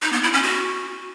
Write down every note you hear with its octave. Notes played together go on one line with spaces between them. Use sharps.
D#4
B3
E4
C#4
F#4